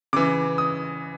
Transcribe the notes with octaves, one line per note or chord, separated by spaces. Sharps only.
C#3 E3 D6
D#6